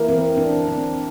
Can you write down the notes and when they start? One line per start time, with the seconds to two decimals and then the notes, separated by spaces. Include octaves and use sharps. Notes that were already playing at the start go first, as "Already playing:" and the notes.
Already playing: E3 A#3 E4 A#4
0.08 C4
0.37 D4
0.68 C4